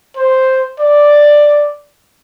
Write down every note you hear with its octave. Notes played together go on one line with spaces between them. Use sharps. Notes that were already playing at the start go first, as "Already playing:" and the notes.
C5
D5